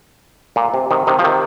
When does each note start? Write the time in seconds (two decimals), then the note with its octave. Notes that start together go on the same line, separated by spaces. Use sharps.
0.56 A#2
0.74 C3
0.91 C3 D#3
1.07 C3 D#3
1.19 F3
1.24 C3 D#3